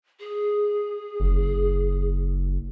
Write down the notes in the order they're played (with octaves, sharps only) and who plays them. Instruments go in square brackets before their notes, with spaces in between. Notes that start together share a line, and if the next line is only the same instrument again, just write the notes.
[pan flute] G#4
[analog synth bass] F#1